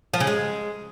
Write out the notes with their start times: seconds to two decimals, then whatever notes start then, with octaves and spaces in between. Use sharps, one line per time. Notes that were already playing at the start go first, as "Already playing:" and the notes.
0.14 F3
0.20 C#3
0.27 G#3